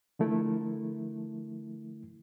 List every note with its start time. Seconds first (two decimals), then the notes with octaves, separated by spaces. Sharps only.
0.19 D3 F3 A3 E4 A#4